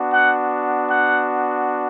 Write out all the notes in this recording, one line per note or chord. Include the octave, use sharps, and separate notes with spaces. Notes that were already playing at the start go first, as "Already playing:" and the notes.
Already playing: B3 D4 F#4
F#5
F#5